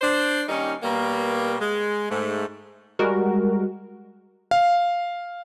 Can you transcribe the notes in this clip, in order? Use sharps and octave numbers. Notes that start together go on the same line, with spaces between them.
D4 C5
D#3 G3 A#3 C#4 D#4
B2 G3 A#3
G#3
G#2 A3
G3 G#3 F#4 A#4
F5